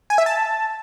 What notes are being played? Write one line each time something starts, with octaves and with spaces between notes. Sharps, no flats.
G#5
E5
A5